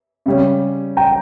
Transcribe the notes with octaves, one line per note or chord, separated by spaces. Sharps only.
C#3 G3 C#4
G5 A#5